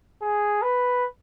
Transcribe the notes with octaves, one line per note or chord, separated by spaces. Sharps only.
G#4
B4